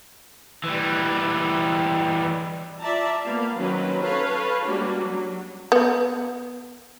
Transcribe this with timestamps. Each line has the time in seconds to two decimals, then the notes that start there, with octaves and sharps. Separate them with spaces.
0.64 E3 G3
2.81 F4 D5 E5 A5 A#5
3.21 A#3 B3 F5
3.57 D#3 F#3 C4 C#4 B4
4.02 A4 B4 C#5 F5
4.66 G3 G#3 A#3 C#4 D4 F#4
5.01 F#3
5.72 B3